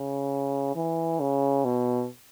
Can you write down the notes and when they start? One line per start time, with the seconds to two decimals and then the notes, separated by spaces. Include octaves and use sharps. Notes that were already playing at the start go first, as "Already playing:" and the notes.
Already playing: C#3
0.75 E3
1.20 C#3
1.65 B2